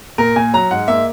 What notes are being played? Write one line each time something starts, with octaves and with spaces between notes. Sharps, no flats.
A#2 A#4
A#2 G#5
F#3 A#5
G#2 F#5
A#3 E5